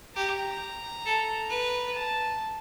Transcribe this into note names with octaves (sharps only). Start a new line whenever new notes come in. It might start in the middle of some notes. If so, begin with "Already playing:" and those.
G4 A#5
A4
B4
A5